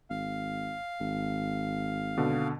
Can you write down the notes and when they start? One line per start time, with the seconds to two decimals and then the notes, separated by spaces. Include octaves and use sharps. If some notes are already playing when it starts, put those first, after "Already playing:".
0.10 G#1 F5
1.00 G#1
2.17 B2 D3